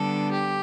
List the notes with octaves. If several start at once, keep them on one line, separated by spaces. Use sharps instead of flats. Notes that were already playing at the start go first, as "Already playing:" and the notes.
Already playing: D3 G3 B3 D4 A4
G4